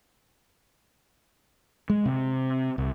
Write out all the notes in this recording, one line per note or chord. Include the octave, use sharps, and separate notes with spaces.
G#3
C3
C2